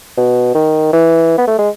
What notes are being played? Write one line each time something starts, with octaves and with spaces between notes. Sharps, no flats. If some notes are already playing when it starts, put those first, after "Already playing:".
B2
D#3
E3
B3
A3
G#3